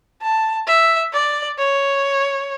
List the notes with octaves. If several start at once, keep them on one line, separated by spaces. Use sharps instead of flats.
A5
E5
D5
C#5